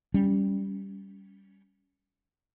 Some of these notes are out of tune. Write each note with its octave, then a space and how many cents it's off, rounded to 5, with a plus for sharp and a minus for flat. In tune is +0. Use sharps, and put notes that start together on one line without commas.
G3 +0 C#4 +15